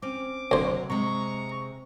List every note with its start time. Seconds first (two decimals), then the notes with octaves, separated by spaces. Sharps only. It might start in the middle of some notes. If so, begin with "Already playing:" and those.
0.02 C4 C#4 D6
0.51 D2 C3 F#3 C5
0.90 C3 G#3 A#5 C#6